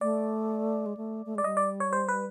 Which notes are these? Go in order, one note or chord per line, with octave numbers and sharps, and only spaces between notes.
A3 D5
G#3
A3
A3
G#3 D5
G3 D#5
D5
C#5
C5
B4